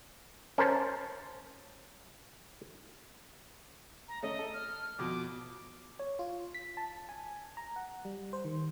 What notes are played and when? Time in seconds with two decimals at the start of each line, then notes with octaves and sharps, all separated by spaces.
0.58 C#4 A#4 C5 A5
4.08 A#5
4.23 A3 C#4 D#5
4.39 A4
4.53 F6
4.99 F2 B2 D6
5.99 C#5
6.19 F4
6.54 B6
6.77 A5
7.09 G#5
7.57 A#5
7.76 F#5
8.05 G3
8.33 C5
8.45 D#3